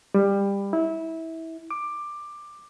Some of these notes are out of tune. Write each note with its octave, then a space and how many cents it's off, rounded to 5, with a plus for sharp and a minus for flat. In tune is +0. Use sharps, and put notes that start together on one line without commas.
G3 +20
E4 -20
D6 +15